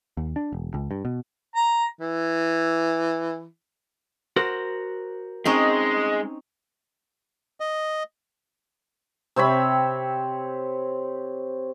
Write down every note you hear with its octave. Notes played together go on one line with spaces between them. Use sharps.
D#2
D4
E1
C#2
G2
B2
A#5
E3
F#4 A#4 C5
G#3 C4 C#4 D#4
D#5
C3 C4 C#5 B5